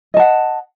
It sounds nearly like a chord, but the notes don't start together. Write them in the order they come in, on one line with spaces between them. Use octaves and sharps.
D#5 A5 F#5